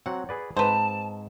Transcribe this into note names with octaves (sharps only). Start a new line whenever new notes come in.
F#3 C4 F#5
G#4 B4 D5
G#2 C4 B4 C5 A5